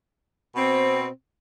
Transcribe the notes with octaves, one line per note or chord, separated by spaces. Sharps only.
B2 C4